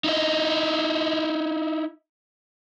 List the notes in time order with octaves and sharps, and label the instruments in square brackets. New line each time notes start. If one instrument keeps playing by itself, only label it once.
[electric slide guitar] D#4 E4 D#5